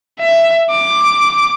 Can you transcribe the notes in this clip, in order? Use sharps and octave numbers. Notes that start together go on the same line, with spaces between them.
E5
D6